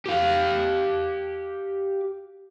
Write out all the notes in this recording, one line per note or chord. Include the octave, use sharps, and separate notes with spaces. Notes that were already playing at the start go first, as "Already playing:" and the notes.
G4 F5